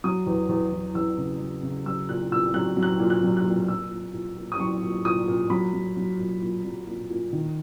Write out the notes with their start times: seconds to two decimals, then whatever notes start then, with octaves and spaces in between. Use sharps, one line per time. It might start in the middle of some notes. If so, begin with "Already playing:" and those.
0.04 F#3 D#6
0.26 E2
0.49 E2
0.72 E2
0.95 E2 E6
1.17 C#3
1.40 F#3
1.63 C#3
1.86 F#3 E6
2.09 A#2 F#6
2.32 A#2 E6
2.54 F#3 F#6
2.77 F#3
2.83 F#6
3.00 A#2
3.10 F#6
3.23 F#3
3.37 F#6
3.45 A#2
3.68 A#2 E6
3.91 A#2
4.13 A#2
4.37 A#2
4.52 D#6
4.59 F#3 C#6
4.83 A#2
5.05 A#2 D#6
5.28 A#2
5.50 F#3 B5
5.73 F#3
5.97 F#3
6.19 A#2
6.42 A#2
6.65 F#3
6.87 A#2
7.10 A#2
7.33 D#3